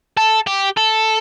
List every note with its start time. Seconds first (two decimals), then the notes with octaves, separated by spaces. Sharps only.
0.17 A4
0.47 G4
0.77 A4